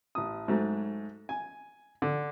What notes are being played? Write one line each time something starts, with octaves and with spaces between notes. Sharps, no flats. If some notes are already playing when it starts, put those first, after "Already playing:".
A1 D#6
G#2 F#3 A3
G#5
D3